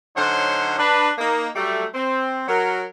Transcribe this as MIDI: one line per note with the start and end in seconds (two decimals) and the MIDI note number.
0.16 0.75 50
0.16 0.75 54
0.16 0.75 61
0.16 0.75 63
0.16 0.75 72
0.79 1.11 62
0.79 1.11 71
1.18 1.48 58
1.18 1.48 63
1.55 1.85 54
1.55 1.85 55
1.55 1.85 57
1.94 2.43 60
2.48 2.83 54
2.48 2.83 70